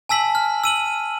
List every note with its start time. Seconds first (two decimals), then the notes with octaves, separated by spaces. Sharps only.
0.09 G#5 A5 E6 B6 F#7
0.35 F6
0.64 E6 D#7 F#7